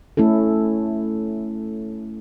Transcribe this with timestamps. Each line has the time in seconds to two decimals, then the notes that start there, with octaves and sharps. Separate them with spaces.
0.17 A3 C#4 E4 A4